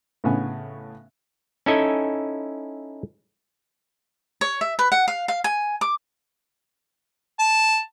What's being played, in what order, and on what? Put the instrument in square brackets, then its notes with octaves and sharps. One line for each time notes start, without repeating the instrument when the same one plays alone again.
[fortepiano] A2 C#3 B3 G#5
[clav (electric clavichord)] C#4 D#4 E4 A4 D#5 G#5
[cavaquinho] C#5
E5
B4
F#5
F5
F5
G#5
D6
[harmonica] A5